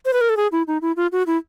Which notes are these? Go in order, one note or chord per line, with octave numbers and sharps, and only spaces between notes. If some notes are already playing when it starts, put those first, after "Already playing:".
C5
B4
A#4
A4
G#4
E4
D#4
E4
F4
F#4
E4